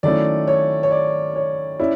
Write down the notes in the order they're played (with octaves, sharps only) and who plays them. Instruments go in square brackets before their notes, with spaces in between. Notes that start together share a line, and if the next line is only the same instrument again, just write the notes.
[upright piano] D#3 F#3 A3 C#4 E4 [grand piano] D5
[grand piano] C#5
C#5
D5
C#5
[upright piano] C#4 E4 [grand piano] D5